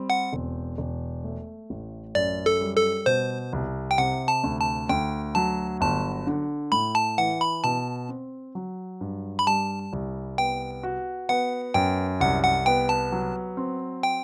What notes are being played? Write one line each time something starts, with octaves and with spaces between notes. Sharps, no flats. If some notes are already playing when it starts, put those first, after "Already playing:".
Already playing: G3 C4
F#5
E1
E1
A3
A1
F#2 D5
A4
G3
A4
B2 C5
C2
G5
C3 F#5
A5
D2
A5
D2 G5
F#3 A5
G1 A5
D3
A2 B5
A5
E3 F#5
B5
B2 A5
C4
F#3
G2
B5
G3 A5
C2
B3 G5
F#4
B3 F#5
F#2 G5
C2 F#5
F#5
B3 G5
A5
F#3
C4
G5